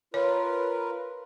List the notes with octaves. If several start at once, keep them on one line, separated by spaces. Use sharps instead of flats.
F4 A#4 B4 C#5